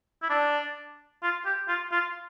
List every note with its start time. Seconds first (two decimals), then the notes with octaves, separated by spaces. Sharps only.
0.23 E4
0.30 D4
1.23 F4
1.46 G4
1.69 F4
1.92 F4